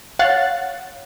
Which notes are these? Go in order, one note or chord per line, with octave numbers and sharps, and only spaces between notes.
C#5 F5 F#5 F#6 A6